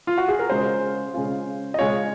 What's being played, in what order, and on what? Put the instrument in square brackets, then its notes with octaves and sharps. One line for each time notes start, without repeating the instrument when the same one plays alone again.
[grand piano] F4
F#4
G#4
A#4
[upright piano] C#3 G#3 C#4 F4 [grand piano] C5
[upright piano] C#3 G#3 C#4 F4
[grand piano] D#5
[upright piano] C#3 G#3 C#4 F4 [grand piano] C#5